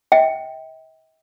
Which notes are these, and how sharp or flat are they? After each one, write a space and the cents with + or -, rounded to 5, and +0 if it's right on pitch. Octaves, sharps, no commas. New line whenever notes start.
E5 -45 G5 +0